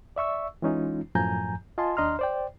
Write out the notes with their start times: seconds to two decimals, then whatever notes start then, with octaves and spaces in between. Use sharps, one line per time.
0.16 D5 E5 C#6 E6
0.62 E3 G#3 C#4 D#4 F4
1.15 F#2 A2 F3 G#5 A#5 G6
1.78 F4 D#5 G#5 A5 C6
1.97 D#2 D4 D#5 A#5 C6 F6
2.19 C5 D5 G5